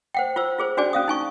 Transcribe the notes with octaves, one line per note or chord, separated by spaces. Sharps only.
C5 F#5 G5
F4 C5 E6
F4 G#4 C5
C#4 D4 F#4 G#4 D5 G#5
C#4 F5 D#6
D#4 G#5 C#6